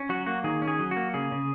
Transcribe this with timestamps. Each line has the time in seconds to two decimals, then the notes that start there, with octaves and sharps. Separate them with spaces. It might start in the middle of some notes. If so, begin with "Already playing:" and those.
Already playing: C#4
0.09 F#3 F#4
0.27 A#3 F#4
0.44 D#3 G#4
0.62 C#4
0.68 G#4
0.79 F#3
0.91 F#4
0.96 A#3
1.14 C#3 G#4
1.32 C#3